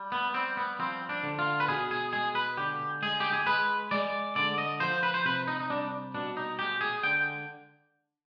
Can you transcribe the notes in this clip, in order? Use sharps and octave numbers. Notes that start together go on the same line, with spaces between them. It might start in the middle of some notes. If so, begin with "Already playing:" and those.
Already playing: G3
B3
G3 C4
B3
F3 C4
D4
D3
F4
B4
B2 G#4
G#4
G#3 G#4
B4
D3 G4
G#3 G#4
G4
G#4
G#3 B4
G#3 D5
D3 D5
D#5
F3 C5
B4
C5
C3 B4
D#4
D#4
G3 D4
B2 D4
D#4
G#3 G4
G#4
D3 G5